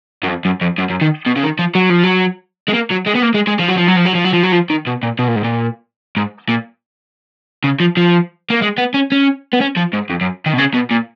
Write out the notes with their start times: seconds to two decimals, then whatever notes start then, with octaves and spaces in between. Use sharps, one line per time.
0.24 F#2
0.28 F2
0.45 F#2
0.61 F2
0.78 F#2
0.90 F#2
1.01 D#3
1.27 B2
1.36 C#3
1.44 D#3
1.59 F3
1.75 F#3
1.90 F3
2.03 F#3
2.68 G#3
2.74 A#3
2.90 F#3
3.06 G#3
3.15 B3
3.22 A#3
3.34 G#3
3.48 G#3
3.60 F3
3.69 F#3
3.78 F3
3.88 F#3
3.97 F3
4.06 F#3
4.15 F3
4.25 F#3
4.34 F3
4.43 F#3
4.53 F3
4.70 D#3
4.87 B2
5.03 A#2
5.19 B2
5.28 A#2
5.36 G#2
5.44 A#2
6.17 G#2
6.49 A#2
7.64 C#3
7.80 F3
7.97 F3
8.50 A#3
8.62 G#3
8.78 B3
8.94 C#4
9.12 C#4
9.53 B3
9.61 C#4
9.77 F3
9.93 G#2
10.10 F2
10.21 F#2
10.46 D#3
10.53 B2
10.58 C#3
10.74 B2
10.91 A#2